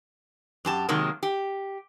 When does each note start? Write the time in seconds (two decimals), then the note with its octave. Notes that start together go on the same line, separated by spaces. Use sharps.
0.65 F#2 G4 A5
0.89 C3 D#3 F#3 G#3 A#3
1.23 G4